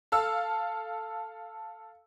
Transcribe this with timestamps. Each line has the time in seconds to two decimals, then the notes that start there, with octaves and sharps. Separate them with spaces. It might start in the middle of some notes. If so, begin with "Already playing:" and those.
0.12 A4 F5 E6